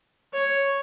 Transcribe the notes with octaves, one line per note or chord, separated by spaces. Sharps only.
C#5